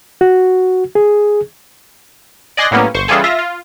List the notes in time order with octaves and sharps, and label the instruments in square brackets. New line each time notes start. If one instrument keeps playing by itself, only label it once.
[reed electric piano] F#4
G#4
[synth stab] D5 D#5 G#5 C6 F#6 A#6
A2 F#3 G3 A#3 B3 C#4
G1 C5 C#6
C#3 E3 G3 F4 G#4 A4
F4 E5 A#6
F4